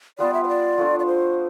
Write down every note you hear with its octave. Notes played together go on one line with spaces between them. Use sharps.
G3 B3 F4 D5
E5
C5
D5
F3 A3 D4
D5
C5